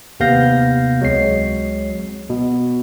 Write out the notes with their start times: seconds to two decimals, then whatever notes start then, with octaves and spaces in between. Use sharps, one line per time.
0.20 D#2 C3 B3 F5 G6 A#6
1.00 C#2 F#3 G#3 C4 C#5 C7
2.30 B2